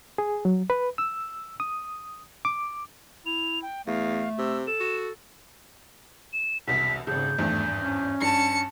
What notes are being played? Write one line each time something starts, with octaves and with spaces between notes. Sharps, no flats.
G#4
F#3
B4
E6
D#6
D6
E4 F7
G5
E2 A3 F5
C3 E6
A4 E7
F#4
E7
E1 C2 B6
D#1 G#1 C#3 G6
G#1 E2 G2 A3
C#4
G2 A5 C#7